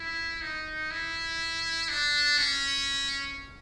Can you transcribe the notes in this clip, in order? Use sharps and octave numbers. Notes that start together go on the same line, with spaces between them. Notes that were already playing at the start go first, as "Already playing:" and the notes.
Already playing: E4
D#4
E4
D4
C#4